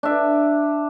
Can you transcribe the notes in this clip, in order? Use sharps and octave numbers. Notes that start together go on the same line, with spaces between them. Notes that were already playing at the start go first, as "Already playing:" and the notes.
D4 E5